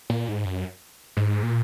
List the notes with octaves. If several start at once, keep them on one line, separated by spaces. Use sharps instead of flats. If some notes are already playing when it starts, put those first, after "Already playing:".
A#2
G#2
F#2
G#2
A#2